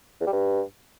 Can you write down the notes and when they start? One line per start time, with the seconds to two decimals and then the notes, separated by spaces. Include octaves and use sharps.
0.21 E2
0.27 G3
0.33 G2